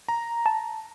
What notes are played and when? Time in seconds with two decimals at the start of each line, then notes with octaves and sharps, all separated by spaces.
0.08 A#5
0.46 A5